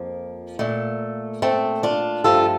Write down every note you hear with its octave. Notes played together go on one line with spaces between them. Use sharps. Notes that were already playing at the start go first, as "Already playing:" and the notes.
Already playing: F2 F3 A#3
A#2 A3
A3 C4
D4 F4
G2 F3 A3 F4 A4